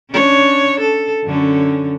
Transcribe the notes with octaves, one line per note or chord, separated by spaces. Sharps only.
C#4 D4 C#5
A4
F#2 D3 C#4